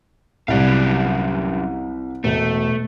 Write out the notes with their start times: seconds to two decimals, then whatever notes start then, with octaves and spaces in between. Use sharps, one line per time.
0.48 C2 F#2 G3 G4 F5
2.24 E1 A3